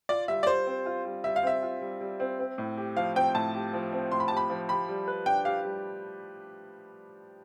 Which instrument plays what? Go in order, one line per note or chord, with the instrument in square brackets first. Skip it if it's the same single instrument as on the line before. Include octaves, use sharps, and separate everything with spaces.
[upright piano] F4 [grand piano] D5
[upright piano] G3 [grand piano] E5
[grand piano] D5
[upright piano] G3 [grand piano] C5
[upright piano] C4
F4
G3
[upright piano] G3 [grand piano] E5
[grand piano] F5
[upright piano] C4 [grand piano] E5
[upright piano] F4
G3
G3
C4
C4
A2
G4
[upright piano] F3 [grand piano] F5
[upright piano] C4 [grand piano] G5
[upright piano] A2 [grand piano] A5
[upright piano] G4
F3
C4
[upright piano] A2 [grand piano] C6
[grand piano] B5
[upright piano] G4 [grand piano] A5
[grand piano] B5
[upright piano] F3
[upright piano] G4 [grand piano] B5
[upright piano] G3
B4
[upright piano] D4 [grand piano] G5
[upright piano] G4 [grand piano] F5
[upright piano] G3